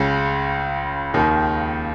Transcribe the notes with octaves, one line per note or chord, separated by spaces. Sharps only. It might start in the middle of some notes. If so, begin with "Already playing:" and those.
Already playing: C#2 C#3
D#2 D#3